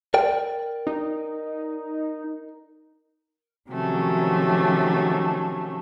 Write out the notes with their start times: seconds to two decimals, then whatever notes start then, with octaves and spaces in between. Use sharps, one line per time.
0.14 A#4 D5 G5
0.87 D#4
3.70 C3 D#3 F3 F#3 A3 C#4